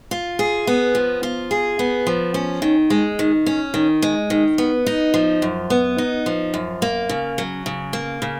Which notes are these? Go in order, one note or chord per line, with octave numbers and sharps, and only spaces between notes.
F4
G#4
B3
F3
F4
G#4
B3
F3
C#4
D#3
G#3
D#3
C#4
D#3
G#3
D#3
B3
D#4
F3
F#2
B3
D#4
F3
F#2
A#3
C#3
F#3
C#3
A#3
C#3